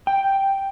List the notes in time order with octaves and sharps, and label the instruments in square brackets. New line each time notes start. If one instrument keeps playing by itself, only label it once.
[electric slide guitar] G5